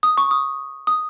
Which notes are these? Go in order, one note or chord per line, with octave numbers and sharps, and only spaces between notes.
D#6
C#6
D#6
D#6